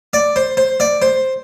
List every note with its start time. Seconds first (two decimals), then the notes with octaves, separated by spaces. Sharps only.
0.13 D5
0.36 C5
0.57 C5
0.80 D5
1.02 C5